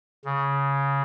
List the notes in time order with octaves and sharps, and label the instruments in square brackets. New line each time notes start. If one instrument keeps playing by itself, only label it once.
[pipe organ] C#3